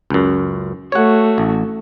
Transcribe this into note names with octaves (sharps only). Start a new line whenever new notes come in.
C#2 F#2
A3 F#4 C#5 F#5
A1